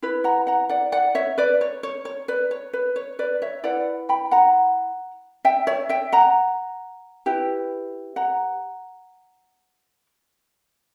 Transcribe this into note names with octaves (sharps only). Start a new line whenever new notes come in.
E4 B4
F#5 A#5
F#5 A#5
D5 F#5
D5 F#5
C#5 E5
B4 D5
C#5
C#5
C#5
B4 D5
C#5
B4
C#5
B4 D5
C#5 E5
E4 B4 D5 F#5
G5 B5
F#5 A#5
E5 G5
C#5 E5
E5 G5
F#5 A#5
E4 G4 B4
F#5 A#5